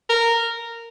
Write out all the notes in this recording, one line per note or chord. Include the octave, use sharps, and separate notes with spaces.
A#4